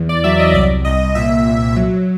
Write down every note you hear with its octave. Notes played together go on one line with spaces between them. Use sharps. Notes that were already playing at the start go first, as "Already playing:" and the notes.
Already playing: E2
D5
F#3 E5
D#5
C2 D5
C2 D#5
A#2 E5
C2
F#3